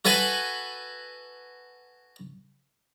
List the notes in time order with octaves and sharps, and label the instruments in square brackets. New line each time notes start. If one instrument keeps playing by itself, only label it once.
[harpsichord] F#4 A4 B4 G#5